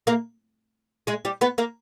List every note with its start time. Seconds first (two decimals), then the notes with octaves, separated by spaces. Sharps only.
0.07 A#3 A#4
1.07 G#3 G#4
1.25 G3 G4
1.41 B3 B4
1.58 A#3 A#4